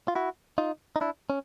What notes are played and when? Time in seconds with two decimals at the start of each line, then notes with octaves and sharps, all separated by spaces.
0.08 F4
0.15 E4 F#4
0.58 D#4 F4
0.96 D#4
1.01 D4 E4
1.30 C#4